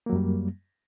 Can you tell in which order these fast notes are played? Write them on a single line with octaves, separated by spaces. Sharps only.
A#3 F#3 F#2 G3